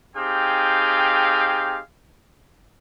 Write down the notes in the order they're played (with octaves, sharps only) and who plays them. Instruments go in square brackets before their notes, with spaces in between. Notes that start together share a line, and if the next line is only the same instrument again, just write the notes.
[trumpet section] C4 D#4 G4 G#4 F5 G5